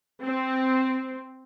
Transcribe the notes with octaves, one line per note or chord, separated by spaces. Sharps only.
C4